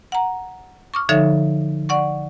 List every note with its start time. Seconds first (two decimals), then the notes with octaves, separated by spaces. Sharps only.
0.12 F#5 A#5
0.94 C#6 D6 F6
1.09 D3 F3 D#4 A4 C#5 E5
1.89 D5 F#5 C#6